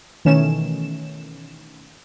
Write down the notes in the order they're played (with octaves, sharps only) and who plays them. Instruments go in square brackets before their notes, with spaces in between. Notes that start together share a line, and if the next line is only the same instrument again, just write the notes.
[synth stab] B2 D#3 E3 A3 C#4 E7